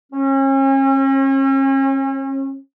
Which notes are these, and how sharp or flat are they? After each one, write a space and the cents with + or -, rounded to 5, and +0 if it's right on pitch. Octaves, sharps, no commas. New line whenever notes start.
C#4 -40